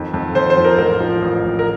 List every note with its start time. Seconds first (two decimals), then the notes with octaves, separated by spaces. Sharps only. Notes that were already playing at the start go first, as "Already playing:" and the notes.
Already playing: F2 D#3
0.14 F2
0.35 F2 C5
0.50 C5
0.57 F3
0.65 A#4
0.78 A1 A#4
1.00 F3
1.22 A1
1.43 A1
1.59 A#4